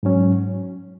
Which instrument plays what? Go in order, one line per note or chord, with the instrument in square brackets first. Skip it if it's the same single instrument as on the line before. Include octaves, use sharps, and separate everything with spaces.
[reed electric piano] G#2 F#3 C#4